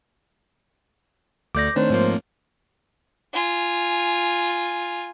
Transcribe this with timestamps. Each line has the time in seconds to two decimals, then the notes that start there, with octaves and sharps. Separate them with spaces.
1.55 D2 A3 D5 D6 G6 A#6
1.76 D#3 A3 C4 D4 C5 C#5
1.90 G#2 F3 A#3
3.33 F4 G#5